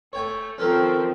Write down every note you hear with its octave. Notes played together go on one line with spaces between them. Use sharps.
A3 C#5 G5 G#5
D#3 F3 C4 C#4 A4 A#4